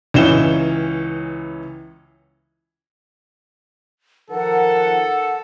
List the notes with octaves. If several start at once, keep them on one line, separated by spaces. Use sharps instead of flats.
C#2 E3 C#4 D#4 E7 G7
D#3 F3 A4 A#4 F#5